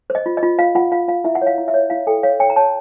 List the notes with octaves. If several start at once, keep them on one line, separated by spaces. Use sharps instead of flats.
C5
D#5
F4
D#5
F4
F4 F5
F4 F#5
F4 F5
F4 F5
E4 E5
F#5
C#5
F5
E4
E5
C#5
E4 F5
A4 G5
C#5 F5
C#5 G5
A#5
C#5 A5